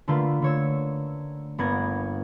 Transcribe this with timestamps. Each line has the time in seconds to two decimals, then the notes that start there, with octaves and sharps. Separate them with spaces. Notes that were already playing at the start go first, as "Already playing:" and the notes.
0.08 D3 A3 A#3 F4 B4
0.42 D3 C#5 E6
1.58 G1 A#3 B3 G#6 A#6